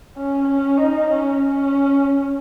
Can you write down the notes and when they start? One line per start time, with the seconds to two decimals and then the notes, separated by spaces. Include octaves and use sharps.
0.17 C#4
0.47 C#4
0.78 D#4
1.10 C#4
1.41 C#4